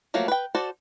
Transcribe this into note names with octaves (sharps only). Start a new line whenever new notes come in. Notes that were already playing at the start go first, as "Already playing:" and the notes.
F3 F#3 A3 A#3
B4 G5
F#4 A4 C5 D5